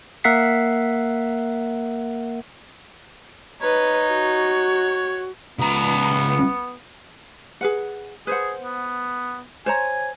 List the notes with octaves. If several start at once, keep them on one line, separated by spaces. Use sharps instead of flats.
A#3 A#4 E5 F#5 B6 C7
D#4 B4 C#5
F#4
C#2 B3 A#5
G#4 B4 F#5
G#4 B4 C5 F#5
B3
C5 C#5 G#5 A#5